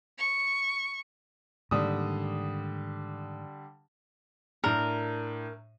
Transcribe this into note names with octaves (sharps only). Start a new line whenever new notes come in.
C#6
G#2 D3 D#3 G3 A#3 D#6
A2 D4 A#4